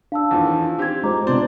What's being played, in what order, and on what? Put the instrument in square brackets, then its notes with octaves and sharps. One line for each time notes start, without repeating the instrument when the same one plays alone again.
[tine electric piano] D4 [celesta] F5 A5 E6
[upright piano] E2 D#3 F3
[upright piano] C4 G4 [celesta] D#4 G#6
[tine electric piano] G#3 F4 C5 [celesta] D#5 A#5 D6
[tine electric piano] C3 B3 C4 [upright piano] D4 C5 D5